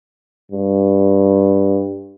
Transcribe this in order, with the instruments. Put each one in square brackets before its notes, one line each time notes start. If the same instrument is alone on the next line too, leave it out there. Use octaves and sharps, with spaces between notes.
[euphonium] G2